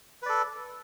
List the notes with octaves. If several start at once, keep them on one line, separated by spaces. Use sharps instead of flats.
A4 B4 D5